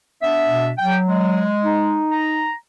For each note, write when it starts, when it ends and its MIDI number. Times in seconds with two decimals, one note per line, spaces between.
0.22 0.68 59
0.22 0.68 62
0.22 0.68 76
0.46 0.73 47
0.78 1.50 54
0.78 0.96 79
1.08 1.99 56
1.63 2.48 63
2.12 2.54 82